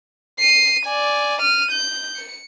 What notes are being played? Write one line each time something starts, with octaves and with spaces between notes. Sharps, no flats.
C7 D#7
D5 G#5
F6 D#7
G6
C#7